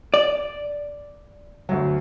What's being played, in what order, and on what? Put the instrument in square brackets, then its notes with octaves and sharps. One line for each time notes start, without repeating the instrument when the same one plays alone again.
[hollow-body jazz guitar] D5
[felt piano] D2 F#3